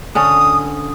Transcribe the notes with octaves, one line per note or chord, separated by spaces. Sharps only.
D3 C#4 D#6